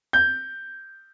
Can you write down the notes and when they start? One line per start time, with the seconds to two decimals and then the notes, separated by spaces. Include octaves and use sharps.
0.13 G6